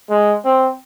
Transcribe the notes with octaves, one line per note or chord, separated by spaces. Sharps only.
G#3
C4